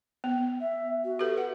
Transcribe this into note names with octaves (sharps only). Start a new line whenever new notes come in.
B3
E5
F#4
G4 A4 B4
F#5